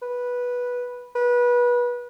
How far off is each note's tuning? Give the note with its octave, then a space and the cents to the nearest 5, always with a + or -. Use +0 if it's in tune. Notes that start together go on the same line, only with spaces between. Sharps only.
B4 -10
B4 -25